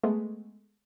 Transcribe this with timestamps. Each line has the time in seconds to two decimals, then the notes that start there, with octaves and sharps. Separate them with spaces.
0.03 G#3 A3 B3